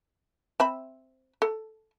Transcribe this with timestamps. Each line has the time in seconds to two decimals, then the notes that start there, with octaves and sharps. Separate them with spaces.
0.60 C4 E5 B5
1.42 A4